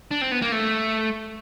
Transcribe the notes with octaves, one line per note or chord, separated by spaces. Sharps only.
D4
C4
B3
A#3
A3